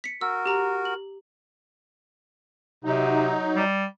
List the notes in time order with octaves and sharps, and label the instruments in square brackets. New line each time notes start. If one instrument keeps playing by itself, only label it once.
[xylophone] B6 C#7
[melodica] F#4 A#4 [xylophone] E6
[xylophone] G4 A#5
F#7
[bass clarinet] C3 [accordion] F#3 D#4
[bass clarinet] G3